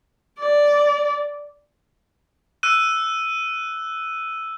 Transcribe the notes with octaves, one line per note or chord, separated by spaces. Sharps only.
D5
E6 F#6 D#7